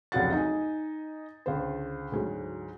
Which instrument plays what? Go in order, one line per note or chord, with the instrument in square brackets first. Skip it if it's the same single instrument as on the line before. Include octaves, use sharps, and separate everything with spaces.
[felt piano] F1 C#2 F#3 F#5 A6
D#4 G#5
C#2 D3 C5
D2 G#2 F#3